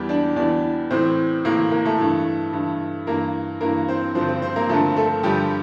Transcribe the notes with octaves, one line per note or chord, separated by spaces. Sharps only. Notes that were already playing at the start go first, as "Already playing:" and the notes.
Already playing: E2 E3 G3 G4
D4 D5
E2 E3 D4 D5
A2 E3 C4 C5
A2 E3 A#3 A#4
A#3 A#4
A3 A4
G2 E3
G2 E3
G2 E3 A#3 A#4
G2 E3 A#3 A#4
C4 C5
G2 D3 F3 C4 C5
C4 C5
C4 C5
A#3 A#4
G2 D3 F3 A3 A4
A3 A4
G2 D3 F3 G3 G4